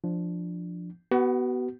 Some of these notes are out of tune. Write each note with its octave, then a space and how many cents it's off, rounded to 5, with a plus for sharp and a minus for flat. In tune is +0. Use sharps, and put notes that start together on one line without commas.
F3 +0 D4 +10
B3 +0 F#4 +35